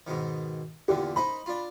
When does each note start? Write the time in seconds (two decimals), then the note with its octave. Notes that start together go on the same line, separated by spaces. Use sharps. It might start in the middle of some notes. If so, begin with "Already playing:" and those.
0.07 G#2 B2 D#3
0.88 E2 A#2 D3 G4
1.16 D#4 C5 D#5 B5
1.46 D4 F4